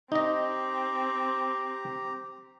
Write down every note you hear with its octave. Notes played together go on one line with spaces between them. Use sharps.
C4 D#4 G4 D#5 A#5